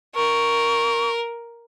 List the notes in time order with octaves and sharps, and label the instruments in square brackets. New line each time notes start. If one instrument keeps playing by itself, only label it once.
[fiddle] A#4 [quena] C#6